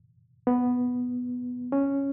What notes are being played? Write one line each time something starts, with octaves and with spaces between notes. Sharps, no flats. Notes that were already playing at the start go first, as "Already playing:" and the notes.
B3
C#4